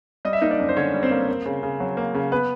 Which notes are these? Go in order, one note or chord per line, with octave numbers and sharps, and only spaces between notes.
G3 D#5
E5
A#3 D#4 D#5
D4 D5
F#2
C5
D3 C#4 C#5
G3
C4 C5
A#3
A#3
C#3
C#3
F#3
A#3
C#3
B3 B4